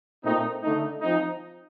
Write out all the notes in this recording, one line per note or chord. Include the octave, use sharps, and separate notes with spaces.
A#2 A3 C4 D#4
D3 A3 D#4
F3 C4 D#4